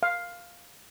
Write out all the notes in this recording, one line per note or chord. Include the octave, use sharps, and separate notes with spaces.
F5